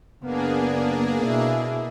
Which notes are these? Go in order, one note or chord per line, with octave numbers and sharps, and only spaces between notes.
F#1 A#3 B3 D4 G#4
B2 E4